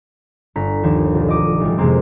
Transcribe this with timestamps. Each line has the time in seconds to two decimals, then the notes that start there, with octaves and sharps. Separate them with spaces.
0.56 G1 A#5 B6
0.83 D#2 F3
1.14 B1
1.28 D#5 D6 D#6
1.60 A1 G3
1.78 F2 C3 G#3 A#3 C4